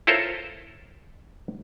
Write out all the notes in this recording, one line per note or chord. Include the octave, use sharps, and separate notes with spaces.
E4 F4 A4 A#4 C5 C#5